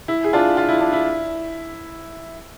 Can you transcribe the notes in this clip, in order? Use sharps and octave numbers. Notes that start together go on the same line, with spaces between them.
E4
G#4
D4 F4
F4
E4
D4
E4